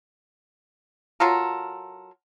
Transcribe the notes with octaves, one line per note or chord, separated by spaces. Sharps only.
F#3 F4 A4 A#4